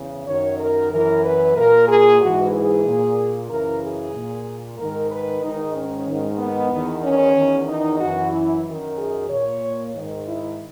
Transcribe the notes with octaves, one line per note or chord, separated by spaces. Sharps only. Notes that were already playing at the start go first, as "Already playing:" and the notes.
Already playing: E2 C#3 E3
F#2 D#3 C#5
A#4
F#2 E3 A#4
B4
A#2 A#4
G#4
G#2 E3 F#4
G#4
A#2
F#2 C#3 E3 A#4
G#4
A#2
G#2 D#3 A#4
B4
G#2 D#3 D#4
C#4
G#2 D#3
B3
E2 D#3
C#4
E2 D#3
D#4
F#2 E3 F#4
E4
F#2 D#3
G#4
A#2 C#5
G#2 D#3
E4